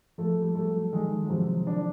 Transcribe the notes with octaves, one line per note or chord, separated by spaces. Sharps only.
F3 A3
G3
A3
F#3
D#3 G#3
F#3
C3 F3
D4